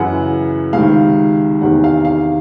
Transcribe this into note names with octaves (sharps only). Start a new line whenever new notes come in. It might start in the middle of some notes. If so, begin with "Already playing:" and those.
Already playing: F#2 C#3 E3 F#5
C#2 C3 D#3 F5
E2 C3 D#3 F#5
F5
F5